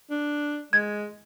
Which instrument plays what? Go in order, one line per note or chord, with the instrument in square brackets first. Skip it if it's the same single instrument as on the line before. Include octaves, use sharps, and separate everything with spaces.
[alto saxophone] D4
[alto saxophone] G#3 [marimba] G#6